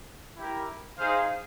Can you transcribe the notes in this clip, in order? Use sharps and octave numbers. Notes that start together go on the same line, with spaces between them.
E4 G4 A#4
D#4 G#4 C5 F5